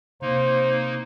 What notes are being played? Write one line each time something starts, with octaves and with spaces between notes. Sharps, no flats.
C3 A#3 D#4 C5